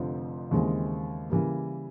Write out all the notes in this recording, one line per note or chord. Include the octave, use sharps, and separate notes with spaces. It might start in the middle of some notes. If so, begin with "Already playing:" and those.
Already playing: F1 F2 D3 F3
D#2 C#3 E3 G#3 C4
C#3 E3 G3 A#3